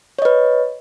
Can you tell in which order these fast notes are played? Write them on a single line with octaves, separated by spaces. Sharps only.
C#5 D#5 B4